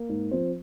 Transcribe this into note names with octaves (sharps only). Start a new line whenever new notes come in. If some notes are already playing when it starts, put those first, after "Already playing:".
Already playing: A#3
G#2
F3 C4